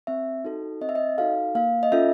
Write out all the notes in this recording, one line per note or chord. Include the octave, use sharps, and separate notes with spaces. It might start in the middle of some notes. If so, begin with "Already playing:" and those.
C4 E5
D#4 F#4 A4
C4 D#5
E5
D#5
D#4 F#4 A4 F5
A#3 F5
D#5
C#4 F4 A4 E5